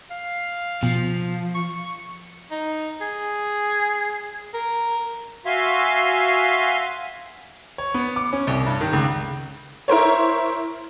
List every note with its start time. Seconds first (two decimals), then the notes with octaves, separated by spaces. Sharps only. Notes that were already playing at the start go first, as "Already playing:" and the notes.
0.11 F5
0.83 B2 F3
1.55 C#6
2.51 D#4
3.01 G#4
4.54 A#4
5.46 F#4 E5 F5 G#5 C6
7.78 C#5
7.94 B3
8.16 D6
8.33 C#4
8.47 C2
8.66 G2
8.81 D#3
8.93 C#2
9.88 E4 A#4 C5 C#5